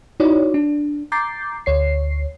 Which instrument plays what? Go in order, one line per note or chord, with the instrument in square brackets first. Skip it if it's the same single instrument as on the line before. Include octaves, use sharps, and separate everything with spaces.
[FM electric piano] D#4 E4 F#4 C#5 D5
D4
A#5 D6 G6 A6 C7
D2 C#5 C7